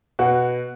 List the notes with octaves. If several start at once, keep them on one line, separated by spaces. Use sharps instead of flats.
B2 F#4